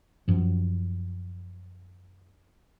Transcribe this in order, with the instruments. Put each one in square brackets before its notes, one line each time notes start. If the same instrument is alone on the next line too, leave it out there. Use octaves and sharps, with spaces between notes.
[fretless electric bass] F#2 F3